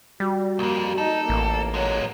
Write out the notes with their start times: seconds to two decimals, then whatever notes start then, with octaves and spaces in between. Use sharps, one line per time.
0.20 G3 F#4
0.59 C2 F2 A#3
0.98 D#4 A4
1.29 A1 A#3
1.74 F#3 G#3 C#5